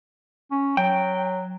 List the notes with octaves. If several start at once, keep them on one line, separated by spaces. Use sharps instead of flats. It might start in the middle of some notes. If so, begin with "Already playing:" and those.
C#4
F#3 G5